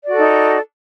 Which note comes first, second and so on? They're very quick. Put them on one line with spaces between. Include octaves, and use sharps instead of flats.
D5 F#4 A4 D#4